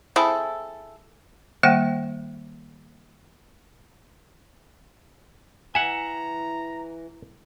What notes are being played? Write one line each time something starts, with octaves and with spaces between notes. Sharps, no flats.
C4 E4 G#4 A4
D#3 G3 A#3 E5 F#5 G5
E3 E5 F#5 G#5 A#5